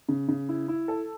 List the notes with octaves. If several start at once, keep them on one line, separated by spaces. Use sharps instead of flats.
C#3
C#3
E4
E4
A4